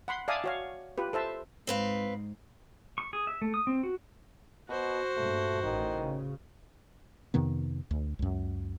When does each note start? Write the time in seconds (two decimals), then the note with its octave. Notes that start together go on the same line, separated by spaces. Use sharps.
0.08 F#5 B5 C6
0.28 D5 E5 F5 G#5 A5 D#6
0.44 F#4 C#5 F5
0.98 F4 G4 B4
1.13 A4 C5 E5 A5
1.67 G#2 C4 B4 F5
2.98 C#6
3.13 G#4
3.27 E5
3.42 A3
3.54 D#6
3.67 C4
3.83 F#4
4.69 B2 F#4 C5
5.17 G2 A#2 A3
5.62 A1 D#3
5.98 C#3
7.34 F2 C3 D#3 B3
7.91 D2
8.19 C#2 F#2